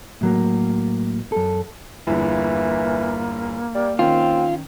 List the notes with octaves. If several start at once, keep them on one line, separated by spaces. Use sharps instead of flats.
A2 F#3 A#3
F#2 A4
G1 E2 E3 A#3
G3
D#3 C4 C#4 F4